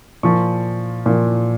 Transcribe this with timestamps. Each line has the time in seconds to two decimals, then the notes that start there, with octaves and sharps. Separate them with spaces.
0.23 A#2 F3 C#6
1.06 A#2 F3